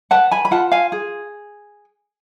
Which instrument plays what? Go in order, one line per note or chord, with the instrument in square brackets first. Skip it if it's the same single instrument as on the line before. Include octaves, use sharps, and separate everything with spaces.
[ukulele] B4 F#5 A5
G#5 B5
B5
F4 F#5 A5
F5 G#5
G#4